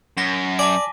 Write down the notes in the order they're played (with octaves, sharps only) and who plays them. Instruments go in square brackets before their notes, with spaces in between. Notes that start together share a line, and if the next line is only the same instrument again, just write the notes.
[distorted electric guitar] F#2 [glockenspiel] A#6 B6 G7
[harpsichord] D5 [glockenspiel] G#5 A5 D6